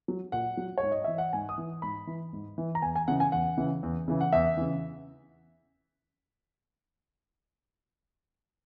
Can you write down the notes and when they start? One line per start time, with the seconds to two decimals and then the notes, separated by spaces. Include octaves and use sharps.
0.08 F#3
0.32 A#2 F#5
0.57 F#3
0.78 C#5
0.83 G#2
0.92 D#5
1.04 E3 E5
1.18 F#5
1.33 G#2 G#5
1.49 D#6
1.58 E3
1.82 G#2 B5
2.07 E3
2.33 G#2
2.58 E3
2.75 A#5
2.82 E2 G#5
2.96 G#5
3.08 C#3 E3 F#5
3.20 G#5
3.32 E2 F#5
3.57 C#3 E3
3.83 E2
4.08 C#3 E3
4.21 F#5
4.33 E2 E5
4.57 C#3 E3